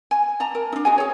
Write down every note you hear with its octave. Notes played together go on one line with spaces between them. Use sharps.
G#5
D5 A5 A#5
A#4
D4 D#4
F#4 G#4 D#5 G#5
G#4 C#5